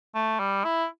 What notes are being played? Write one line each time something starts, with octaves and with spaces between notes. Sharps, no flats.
A3
G3
E4